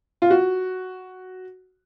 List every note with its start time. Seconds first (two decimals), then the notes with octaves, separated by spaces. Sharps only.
0.22 F4
0.30 F#4